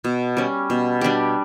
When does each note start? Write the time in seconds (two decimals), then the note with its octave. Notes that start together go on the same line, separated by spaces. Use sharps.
0.04 B2
0.37 G3 C#4
0.70 B2
1.01 G3 D4 G4